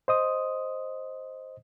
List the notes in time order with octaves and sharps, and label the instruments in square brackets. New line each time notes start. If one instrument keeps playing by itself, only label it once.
[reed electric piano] C5 D#5 D#6